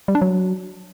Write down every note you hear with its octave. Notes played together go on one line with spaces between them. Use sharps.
G3
D4
F#3